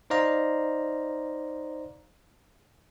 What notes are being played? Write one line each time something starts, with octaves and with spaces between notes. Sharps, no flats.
D#4 C5 D5 D#5 F5 A#5